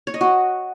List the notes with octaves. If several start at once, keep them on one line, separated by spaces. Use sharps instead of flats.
C#5
D#5
F#4